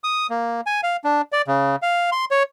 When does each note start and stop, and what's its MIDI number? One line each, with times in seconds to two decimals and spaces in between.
0.04 0.27 87
0.30 0.61 58
0.66 0.81 80
0.83 0.97 77
1.04 1.22 62
1.32 1.42 74
1.48 1.76 49
1.82 2.10 77
2.12 2.25 84
2.31 2.43 73